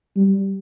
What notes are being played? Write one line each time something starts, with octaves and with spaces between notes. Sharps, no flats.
G3